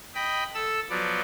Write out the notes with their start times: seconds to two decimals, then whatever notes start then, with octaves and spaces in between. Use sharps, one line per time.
0.15 D#5 G5 B5
0.54 A4 E6
0.90 F3 F#3 B3 D5